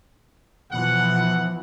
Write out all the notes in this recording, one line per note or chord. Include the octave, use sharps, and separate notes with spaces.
B2 E3 F3 F#5